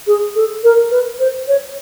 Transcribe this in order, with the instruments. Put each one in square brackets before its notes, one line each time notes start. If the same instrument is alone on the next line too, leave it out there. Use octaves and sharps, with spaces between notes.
[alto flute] G#4
A4
A#4
B4
C5
C#5